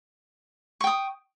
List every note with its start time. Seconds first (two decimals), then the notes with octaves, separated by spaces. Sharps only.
0.81 C#6
0.84 G5
0.87 D#6